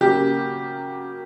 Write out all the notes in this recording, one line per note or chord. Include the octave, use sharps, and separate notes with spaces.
C#3 F#3 A#3 G4